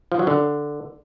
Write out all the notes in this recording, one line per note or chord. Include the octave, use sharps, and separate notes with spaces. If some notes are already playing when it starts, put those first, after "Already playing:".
F3
F#3
D3